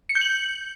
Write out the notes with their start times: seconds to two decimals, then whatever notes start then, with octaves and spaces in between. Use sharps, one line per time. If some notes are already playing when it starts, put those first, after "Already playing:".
0.09 C#7
0.15 G6
0.21 F#7